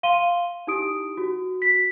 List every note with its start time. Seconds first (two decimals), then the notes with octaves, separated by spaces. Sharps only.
0.03 F5 C6 D#7 G7
0.67 D#4 E4 G4 D#6 D7
1.17 F#4
1.62 B6